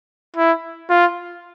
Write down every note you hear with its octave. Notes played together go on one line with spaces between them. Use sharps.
E4
F4